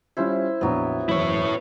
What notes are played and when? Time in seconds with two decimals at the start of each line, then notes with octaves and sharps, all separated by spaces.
0.17 G3 C#4 E4 F4 C5
0.61 A#1 F2 F#3 B3
1.09 F#1 E2 E4 C#5